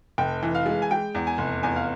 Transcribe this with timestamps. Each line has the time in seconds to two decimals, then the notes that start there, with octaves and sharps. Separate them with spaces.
0.18 F1 G5
0.43 E3
0.55 F5
0.66 G#3
0.82 G#5
0.91 G#3 G5
1.15 E2
1.27 G#5
1.38 F1
1.63 E2 G#5
1.76 F5